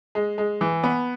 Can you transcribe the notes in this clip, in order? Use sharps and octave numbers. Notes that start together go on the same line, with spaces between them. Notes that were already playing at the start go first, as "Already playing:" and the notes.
G#3
G#3
E3
B3